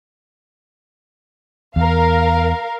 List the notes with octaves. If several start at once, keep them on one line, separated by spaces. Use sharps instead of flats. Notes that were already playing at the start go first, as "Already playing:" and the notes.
E2 A#4 F5